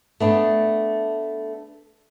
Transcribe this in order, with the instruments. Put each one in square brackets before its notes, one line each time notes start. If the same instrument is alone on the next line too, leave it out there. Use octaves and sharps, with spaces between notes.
[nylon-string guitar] A3 B3 D4